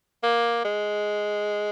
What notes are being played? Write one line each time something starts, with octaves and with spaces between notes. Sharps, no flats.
A#3
G#3